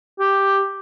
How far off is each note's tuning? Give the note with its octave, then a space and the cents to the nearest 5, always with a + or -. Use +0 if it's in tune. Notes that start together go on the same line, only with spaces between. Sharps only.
G4 +5